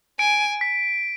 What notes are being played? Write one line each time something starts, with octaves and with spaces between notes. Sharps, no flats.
G#5 D7
B6